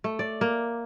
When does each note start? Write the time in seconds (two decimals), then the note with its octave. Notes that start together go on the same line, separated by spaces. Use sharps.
0.04 A3
0.19 D5
0.41 A#3